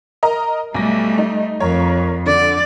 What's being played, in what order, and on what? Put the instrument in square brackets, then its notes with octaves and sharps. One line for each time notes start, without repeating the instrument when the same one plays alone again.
[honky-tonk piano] A#4 D#5 A#5
[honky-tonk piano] B1 A#6 [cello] G3 A3
[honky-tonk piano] D#4
[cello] F2 [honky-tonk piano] A#4 C#5
[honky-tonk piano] D3 [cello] D5